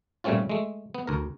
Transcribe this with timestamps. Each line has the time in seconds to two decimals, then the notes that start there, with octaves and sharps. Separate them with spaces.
0.24 A#2 G3 A3 C4 C#4 F4
0.49 G#3 A3
0.94 B3
1.07 D2 A#4